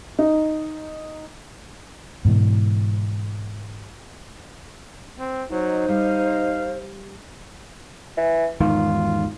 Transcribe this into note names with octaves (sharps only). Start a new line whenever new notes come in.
D#4
G#2 B2 E3
C4
F#3 D#4 C5
G3 F5
E3
E2 G#2 D#3 F4